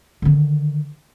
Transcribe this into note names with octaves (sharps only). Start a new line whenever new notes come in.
D3 D#3